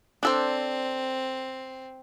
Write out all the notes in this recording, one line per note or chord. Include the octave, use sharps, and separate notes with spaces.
C4 D4 A4 C5